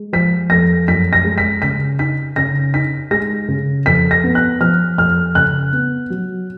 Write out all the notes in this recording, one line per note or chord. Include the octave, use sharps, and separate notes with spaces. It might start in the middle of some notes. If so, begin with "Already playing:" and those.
Already playing: G#3
F3 B6
F2 A#6
F#2 B6
A#6
G#3
B6
C#3 B6
D#4 B6
C#3 A#6
D#4 B6
G#3 A#6
C#3
F2 B6
A#6
B3
F#6
F3 F6
F2 F6
C#3 F#6
B3
F#3